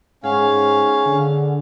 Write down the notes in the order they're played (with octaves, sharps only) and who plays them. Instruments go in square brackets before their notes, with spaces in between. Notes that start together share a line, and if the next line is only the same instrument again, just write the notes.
[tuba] G#2 [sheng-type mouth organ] C#4 F5 [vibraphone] G#4 F#5 G#5
[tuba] D3